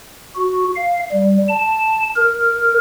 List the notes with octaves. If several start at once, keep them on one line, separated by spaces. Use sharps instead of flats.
F#4
F5
G3
A5
A#4